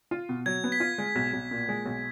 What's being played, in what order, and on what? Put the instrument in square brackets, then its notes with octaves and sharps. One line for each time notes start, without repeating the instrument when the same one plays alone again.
[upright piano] F4
B2
[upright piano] F#3 [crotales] G#6
[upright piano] B3
[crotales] B6
[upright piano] F4
G#3
B1
B1
A#2
G#3
B1